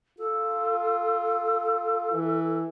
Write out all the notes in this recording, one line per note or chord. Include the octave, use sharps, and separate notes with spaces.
F4 A4
E3